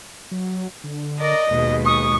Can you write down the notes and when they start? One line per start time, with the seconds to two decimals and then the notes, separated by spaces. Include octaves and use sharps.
0.31 F#3
0.84 D3
1.20 A#4 D5 D#5
1.51 D#2 B2 G#3
1.85 C#6 D#6